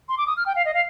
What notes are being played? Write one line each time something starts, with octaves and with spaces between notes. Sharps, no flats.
C6
D6
D#6
F6
G5
F5
D#5
F5